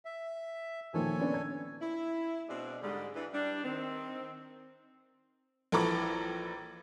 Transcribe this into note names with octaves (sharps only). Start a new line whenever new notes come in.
E5
A#2 D#3 F3 A4 C#5 G#5
B3 C#4 D4
G#6
E4
B2 G#3 C4 D4
G#2 D3 G3 G#3
E3 D4
G3 D4
D#3 C4
A#1 E3 A4 A#5 B5 D6